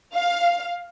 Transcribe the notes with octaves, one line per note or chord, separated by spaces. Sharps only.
F5